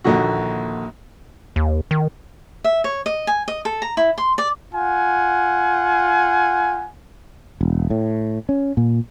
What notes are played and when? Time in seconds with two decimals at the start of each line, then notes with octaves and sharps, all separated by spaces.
0.04 A#1 D#2 D3 F#4
1.56 D#2
1.91 D#3
2.64 E5
2.84 C#5
3.06 D#5
3.27 G#5
3.48 D#5
3.65 A4
3.82 A#5
3.97 E4
4.18 C6
4.38 D5
4.74 F4 F#5 G#5
7.61 E1
7.90 A2
8.49 C#4
8.77 A#2